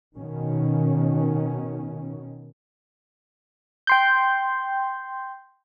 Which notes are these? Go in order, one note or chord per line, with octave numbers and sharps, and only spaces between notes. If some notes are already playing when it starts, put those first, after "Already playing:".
B2 D#3 C#4
G5 C6 G6